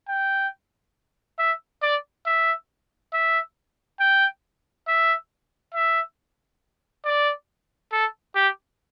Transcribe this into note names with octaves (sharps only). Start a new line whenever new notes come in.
G5
E5
D5
E5
E5
G5
E5
E5
D5
A4
G4